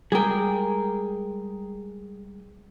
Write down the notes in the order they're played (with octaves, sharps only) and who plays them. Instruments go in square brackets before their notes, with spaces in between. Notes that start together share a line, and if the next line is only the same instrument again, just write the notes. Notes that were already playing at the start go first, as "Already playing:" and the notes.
[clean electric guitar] G3 G#3 G5 [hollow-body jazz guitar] G#4 A#4